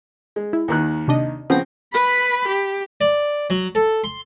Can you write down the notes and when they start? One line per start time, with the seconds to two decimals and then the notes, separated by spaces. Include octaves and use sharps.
0.36 G#3
0.53 E4
0.68 D#2 D#3 F#6
1.08 C3 D4 D#5
1.50 C#3 F3 B3 C4 A#6
1.93 B4 B5
2.48 G4
3.01 D5
3.50 F#3
3.75 A4
4.04 C6